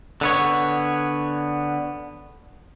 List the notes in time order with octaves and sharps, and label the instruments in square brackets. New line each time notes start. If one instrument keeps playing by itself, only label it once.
[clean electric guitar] D3 B3 C#5